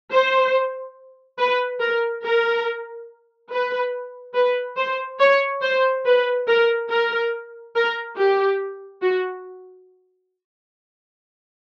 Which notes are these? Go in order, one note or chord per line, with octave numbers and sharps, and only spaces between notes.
C5
B4
A#4
A#4
B4
B4
C5
C#5
C5
B4
A#4
A#4
A#4
G4
F#4